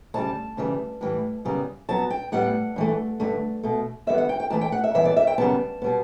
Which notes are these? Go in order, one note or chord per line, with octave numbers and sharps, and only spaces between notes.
D2 C#3 G3 A5
D2 C#3 E3 G3
A2 E3 G3
F#2 C#3 G3 B3
G2 F#3 B3 A5
G5
A2 G3 B3 F#5
G2 E3 A3
G2 D3 A3
B2 A3
E2 D3 G3 B3 E5
F#5
G5
G5
A2 E3 A3 A5
G5
F#5
E5
G2 E3 B3 E5
D5
E5
G5
F#2 C#3 G3 B3 A5
B2 G3 B3